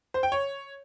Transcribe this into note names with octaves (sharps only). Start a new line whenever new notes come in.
C5
G5
C#5